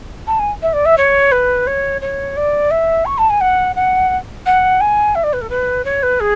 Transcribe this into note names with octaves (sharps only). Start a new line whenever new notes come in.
A5
G#5
E5
D5
E5
C#5
B4
C#5
C#5
D5
E5
C#6
A5
G#5
F#5
F#5
F#5
G#5
E5
D5
B4
A4
B4
C#5
B4
G#4